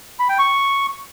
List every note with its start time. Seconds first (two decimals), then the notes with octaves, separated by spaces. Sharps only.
0.19 B5
0.29 G5
0.39 C#6